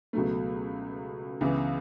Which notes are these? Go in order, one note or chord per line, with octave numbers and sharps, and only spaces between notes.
C#2 B2 F#3 A3
C#2 C#3 E3 B3 E4